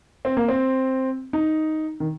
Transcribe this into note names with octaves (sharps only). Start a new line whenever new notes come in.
C4
A#3
C4
D#4
D#3